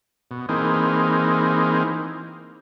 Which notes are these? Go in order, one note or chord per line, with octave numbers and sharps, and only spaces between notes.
B2
E3 A#3 C4 D#4 G#4